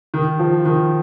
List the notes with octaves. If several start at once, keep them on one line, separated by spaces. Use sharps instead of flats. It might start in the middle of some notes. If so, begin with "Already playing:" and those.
D#3
F3
D#3